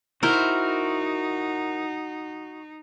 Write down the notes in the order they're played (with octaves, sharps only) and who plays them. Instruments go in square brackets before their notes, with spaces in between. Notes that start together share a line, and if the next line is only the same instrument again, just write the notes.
[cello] D#4 [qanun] E4 C5 [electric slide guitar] F#4 [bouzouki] A#4